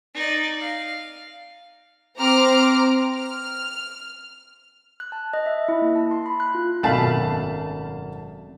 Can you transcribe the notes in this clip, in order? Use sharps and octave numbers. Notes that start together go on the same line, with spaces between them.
D#4 D5
F5
C4 C5 A#5 D6 F6
F6
F#6
A5
D#5
E5
E4
A#3
A5
C6
B5
F#6
F4
G#1 F#2 B2 A3 F5 A5 B5